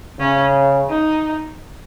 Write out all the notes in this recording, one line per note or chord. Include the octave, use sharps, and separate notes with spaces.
C#3 C#4
D#4